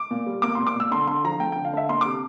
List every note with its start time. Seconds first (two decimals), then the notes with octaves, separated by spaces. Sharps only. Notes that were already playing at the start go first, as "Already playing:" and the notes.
Already playing: D6
0.11 A#2
0.27 G3
0.42 A#3 D6
0.55 A#2 C6
0.67 D6
0.76 A#2 E6
0.91 D3 C6
1.07 D3 C6
1.24 F3 A#5
1.40 A3 G5
1.52 D3 G5
1.65 F5
1.73 D3 E5
1.89 A#3 C6
2.01 C3 D6